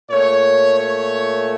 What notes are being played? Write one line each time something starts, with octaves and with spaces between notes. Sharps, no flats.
A#2 A3 C#5
C#5